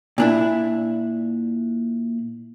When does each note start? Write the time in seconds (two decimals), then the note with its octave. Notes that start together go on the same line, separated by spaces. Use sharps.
0.18 A#2 D4 E4